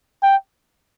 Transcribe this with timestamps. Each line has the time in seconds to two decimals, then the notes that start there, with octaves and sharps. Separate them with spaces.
0.23 G5